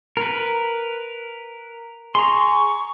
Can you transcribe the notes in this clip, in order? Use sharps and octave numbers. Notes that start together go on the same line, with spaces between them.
A#4 B4
G#4 A#5 C6 C#6